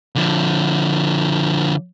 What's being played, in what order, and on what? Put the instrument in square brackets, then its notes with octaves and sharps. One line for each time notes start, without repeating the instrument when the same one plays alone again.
[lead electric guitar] D3 F3